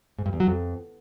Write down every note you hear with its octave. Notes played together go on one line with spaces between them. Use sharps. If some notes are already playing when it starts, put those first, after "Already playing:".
G#2
G2
E2
F#3
F2